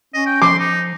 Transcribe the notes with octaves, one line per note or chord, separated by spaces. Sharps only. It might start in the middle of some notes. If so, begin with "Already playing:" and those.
C#4 D#5
G5
F3 C6 D6
D#4